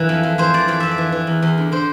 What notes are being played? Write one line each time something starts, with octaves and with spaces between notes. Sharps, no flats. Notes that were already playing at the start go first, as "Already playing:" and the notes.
Already playing: E3 A#4
F2
F2
E3 C5
E3 D5
F2 D5
F2 E5
D5
E3
E3
E2
E2
D3
D3 C5